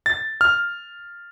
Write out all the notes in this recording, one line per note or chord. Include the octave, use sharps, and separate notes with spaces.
A6
F6